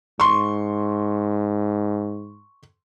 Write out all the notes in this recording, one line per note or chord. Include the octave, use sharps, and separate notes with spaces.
G#2 C6 C#6